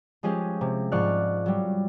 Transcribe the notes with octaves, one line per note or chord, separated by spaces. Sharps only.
F3 G#3 C#4 G4 G#4
C3
G#2 F3 D5 C#6 F6 F#6
F#3 G3